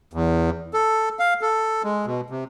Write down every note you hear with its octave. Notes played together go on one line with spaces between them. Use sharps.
E2
A4
F5
A4
G#3
B2
C3